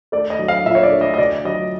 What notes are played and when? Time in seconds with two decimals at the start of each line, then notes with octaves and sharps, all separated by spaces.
0.12 A3 D5
0.30 D#5
0.39 F#3
0.48 F5
0.65 A#1 E5
0.75 C#5
0.83 D5
0.92 A3
1.01 D#5
1.14 D#5
1.18 D2 D5
1.45 F#3 D#5